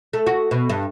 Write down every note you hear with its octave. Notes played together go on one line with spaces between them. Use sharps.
A3
F#4
B2
G2